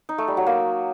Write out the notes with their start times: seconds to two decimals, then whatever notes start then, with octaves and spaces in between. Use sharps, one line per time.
0.09 D#4
0.18 A3
0.28 G3
0.37 F#3
0.47 A#3